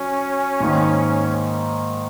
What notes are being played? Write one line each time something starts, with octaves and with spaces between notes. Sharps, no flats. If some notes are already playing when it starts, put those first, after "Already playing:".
Already playing: F#3 C#4
G#2 D#3 A#3 D#4